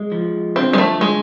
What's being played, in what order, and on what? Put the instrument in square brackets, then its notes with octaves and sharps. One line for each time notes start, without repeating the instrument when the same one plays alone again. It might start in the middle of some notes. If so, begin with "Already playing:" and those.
Already playing: [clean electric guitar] G#3
F3
[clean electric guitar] D3 [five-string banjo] C4
[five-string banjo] G#3
A3
G#3